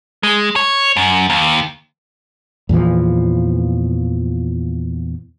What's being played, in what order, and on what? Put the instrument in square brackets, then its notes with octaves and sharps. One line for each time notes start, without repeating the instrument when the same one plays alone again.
[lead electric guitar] G#3
C#5
F#2
D#2
[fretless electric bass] E2 A#2 E3 F3